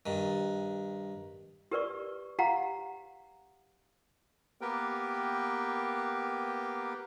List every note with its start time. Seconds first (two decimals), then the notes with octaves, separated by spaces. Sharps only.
0.06 G2 D#3
1.71 G4 A#4 B4 D5 C#6
2.39 G4 F5 F#5 A#5
4.61 A#3 B3 G4 A#4 B4 G5